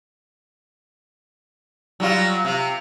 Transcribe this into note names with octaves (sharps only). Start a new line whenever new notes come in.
F#3 G3 F4
C3